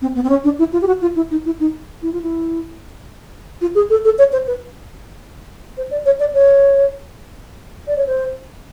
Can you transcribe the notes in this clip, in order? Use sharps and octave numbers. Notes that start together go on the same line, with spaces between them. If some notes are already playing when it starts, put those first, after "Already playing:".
C4
B3
C4
C#4
D4
E4
F4
G4
F#4
F4
E4
D#4
E4
D#4
E4
F4
E4
F4
G#4
A4
A4
C#5
C5
B4
C5
D5
C#5
D5
C#5
D5
C#5
C5